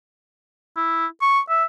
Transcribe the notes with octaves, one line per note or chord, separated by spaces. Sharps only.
E4
C#6
E5